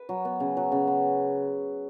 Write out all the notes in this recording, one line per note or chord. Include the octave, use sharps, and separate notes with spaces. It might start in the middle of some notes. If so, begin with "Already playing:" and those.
Already playing: B4
F#3
B3
C#3
F#3
C#3
B3